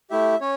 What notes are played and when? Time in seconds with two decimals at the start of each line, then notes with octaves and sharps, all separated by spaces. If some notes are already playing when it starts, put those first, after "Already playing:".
0.10 A3 E4 G4 E5
0.41 C#4 C#5